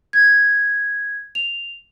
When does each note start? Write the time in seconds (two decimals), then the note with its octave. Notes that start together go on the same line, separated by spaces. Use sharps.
0.13 G#6
1.35 F7